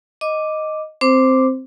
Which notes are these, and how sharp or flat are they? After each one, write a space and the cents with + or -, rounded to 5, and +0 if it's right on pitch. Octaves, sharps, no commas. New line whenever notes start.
D#5 +0 D6 +0
C4 +0 C5 +0 D6 +0